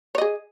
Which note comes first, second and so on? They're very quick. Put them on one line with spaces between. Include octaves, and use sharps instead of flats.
C#5 D#5 G#4